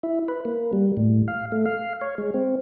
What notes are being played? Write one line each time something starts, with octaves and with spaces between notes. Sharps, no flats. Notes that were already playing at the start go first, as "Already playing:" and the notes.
E4
B4
A#3
G3
A2
F5
A3
F5
C#5
G#3
C4